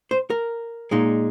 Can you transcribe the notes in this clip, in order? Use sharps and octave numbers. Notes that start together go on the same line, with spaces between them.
C5
A#4
A#2 G#3 D#4